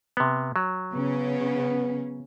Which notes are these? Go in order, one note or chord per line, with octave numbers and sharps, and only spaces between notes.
C3 B3
F#3
C#3 B3 C#4